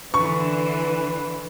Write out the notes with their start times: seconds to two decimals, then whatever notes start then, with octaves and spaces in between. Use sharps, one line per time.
0.14 D3 E3 B4 C#6